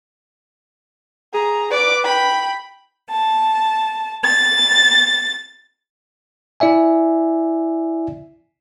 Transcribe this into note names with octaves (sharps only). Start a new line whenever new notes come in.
G#4 A#5
B4 D5 D6
G5 B5
A5
A6
E4 D5 E5 G#5